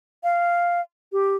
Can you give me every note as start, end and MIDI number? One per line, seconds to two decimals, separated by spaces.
0.24 0.81 77
1.12 1.36 67